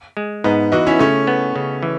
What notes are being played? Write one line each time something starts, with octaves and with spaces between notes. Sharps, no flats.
G#3
G#2 B3 D#4
E3 D#4 F#4
C#4 E4
C#3 A3 C#4
B3
C#3
E3